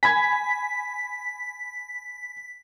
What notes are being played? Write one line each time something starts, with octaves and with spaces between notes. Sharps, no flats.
G#5 B5 G#6 B6